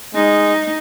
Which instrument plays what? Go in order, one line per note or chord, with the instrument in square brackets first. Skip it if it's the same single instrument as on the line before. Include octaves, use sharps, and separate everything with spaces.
[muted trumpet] G#3 [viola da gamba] D#4